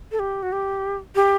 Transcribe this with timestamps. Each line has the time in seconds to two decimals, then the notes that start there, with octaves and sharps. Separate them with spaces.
0.12 A4
0.19 G4
0.43 F#4
0.52 G4
1.15 G4